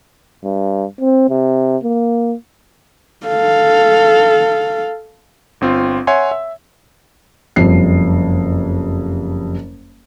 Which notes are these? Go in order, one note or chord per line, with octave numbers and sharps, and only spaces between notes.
G2
C4
C3
A#3
A4 F5
G1 C4 F4
C#5 E5 F#5 G#5 C6
E5
F#1 F2 G3 C7